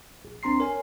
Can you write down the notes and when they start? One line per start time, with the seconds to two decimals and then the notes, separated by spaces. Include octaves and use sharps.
0.25 A#1
0.43 C2 C4 D4 A#5 C6 C7
0.60 A#4 C#5 G#5